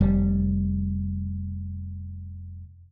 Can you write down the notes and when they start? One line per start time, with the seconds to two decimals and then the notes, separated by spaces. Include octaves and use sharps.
0.01 F1 G3